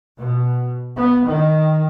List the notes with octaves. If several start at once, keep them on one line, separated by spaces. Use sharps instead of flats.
B2
B3
D#3